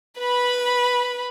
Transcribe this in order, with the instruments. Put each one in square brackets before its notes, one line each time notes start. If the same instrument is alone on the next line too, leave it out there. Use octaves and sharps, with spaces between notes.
[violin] B4 B5